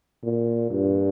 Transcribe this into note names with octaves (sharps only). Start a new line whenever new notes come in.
A#2
G2